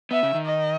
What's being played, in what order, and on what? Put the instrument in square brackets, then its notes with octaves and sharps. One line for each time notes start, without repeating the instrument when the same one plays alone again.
[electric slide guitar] B3 [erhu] E5
[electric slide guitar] C#3
D#3
[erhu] D#5